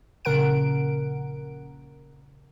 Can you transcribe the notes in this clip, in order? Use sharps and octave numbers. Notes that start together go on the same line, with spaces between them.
A#1 A#2 C#3 A#4 F#5 D7